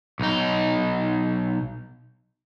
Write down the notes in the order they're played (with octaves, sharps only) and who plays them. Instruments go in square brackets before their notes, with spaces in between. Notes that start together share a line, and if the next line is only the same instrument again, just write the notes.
[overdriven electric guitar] B1 D#4